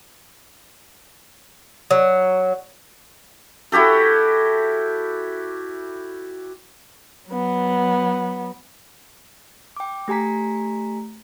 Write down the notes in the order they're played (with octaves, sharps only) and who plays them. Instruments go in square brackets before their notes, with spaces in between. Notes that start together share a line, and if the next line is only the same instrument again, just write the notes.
[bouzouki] F#3
[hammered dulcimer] E4 F#4 G4 A4
[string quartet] F#3 B3
[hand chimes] G5 D6
A3 G4 G#5 A#5 B6